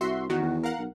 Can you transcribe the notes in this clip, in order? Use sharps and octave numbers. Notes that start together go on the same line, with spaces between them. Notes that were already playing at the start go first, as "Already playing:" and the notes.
C2 F#4 E5 C6
E2 D#3 F#4
E2
A#4 F5 F#5
B1